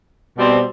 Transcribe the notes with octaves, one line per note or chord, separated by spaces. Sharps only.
B2 G3 C4